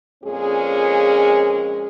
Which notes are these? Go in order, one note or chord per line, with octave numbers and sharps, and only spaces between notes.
F2 A#2 G#3 C#4 G#4